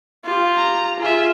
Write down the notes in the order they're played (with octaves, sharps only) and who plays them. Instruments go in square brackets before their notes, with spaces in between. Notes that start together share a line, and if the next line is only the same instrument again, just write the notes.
[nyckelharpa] F4 G4
[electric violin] A#5
[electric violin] F4 E5 [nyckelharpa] G#4